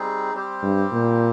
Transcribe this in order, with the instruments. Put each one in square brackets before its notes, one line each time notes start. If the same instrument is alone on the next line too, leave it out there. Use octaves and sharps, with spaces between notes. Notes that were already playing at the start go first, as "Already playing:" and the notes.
Already playing: [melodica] G3 C4 D#4 G#4
G3 C4 G4 C5
[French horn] G2
A#2